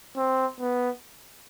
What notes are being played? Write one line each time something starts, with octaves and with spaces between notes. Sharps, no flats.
C4
B3